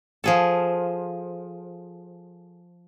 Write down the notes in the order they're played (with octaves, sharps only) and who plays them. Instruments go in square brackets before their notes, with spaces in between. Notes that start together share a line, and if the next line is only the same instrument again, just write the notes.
[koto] F3 G#4 A4